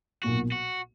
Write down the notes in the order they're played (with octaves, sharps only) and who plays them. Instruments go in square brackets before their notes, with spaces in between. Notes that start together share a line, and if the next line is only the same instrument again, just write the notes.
[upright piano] B1 A#2 A#3 [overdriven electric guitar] F#4
[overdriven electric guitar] F#4